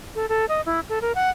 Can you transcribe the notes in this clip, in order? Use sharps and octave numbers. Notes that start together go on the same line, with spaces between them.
A4
A4
D#5
E4
A4
A#4
F#5